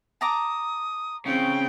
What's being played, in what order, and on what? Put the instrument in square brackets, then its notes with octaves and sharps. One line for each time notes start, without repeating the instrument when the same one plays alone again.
[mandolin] A5 A#5 D6 [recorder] D#6
[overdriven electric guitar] C#3 [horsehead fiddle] C4 G5